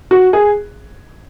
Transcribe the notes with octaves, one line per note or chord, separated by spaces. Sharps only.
F#4
G#4